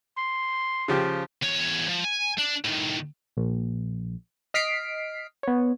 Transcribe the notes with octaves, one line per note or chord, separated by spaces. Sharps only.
C6
C#3 F3 G4
E2 C#5
F3
G#5
D4
A2 D#3
A#1
D#5 F6 B6 C7 D7
B3 C#5